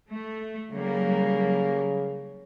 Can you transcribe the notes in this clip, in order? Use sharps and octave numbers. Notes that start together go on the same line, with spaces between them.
A3
C#3 F#3 G3 A#3